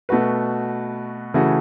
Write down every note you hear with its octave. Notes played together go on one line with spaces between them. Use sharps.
B2 A3 F#4 B4
C#3 E3 A3 F#4